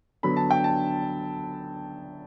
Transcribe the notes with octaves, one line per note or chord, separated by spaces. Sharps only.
D3 F#3 B3 B5
A5
G5
A5